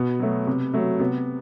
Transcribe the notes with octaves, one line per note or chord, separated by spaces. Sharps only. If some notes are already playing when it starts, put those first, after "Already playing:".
Already playing: B2 B3
F#3 A3
C3
F#3 A3
C3 B3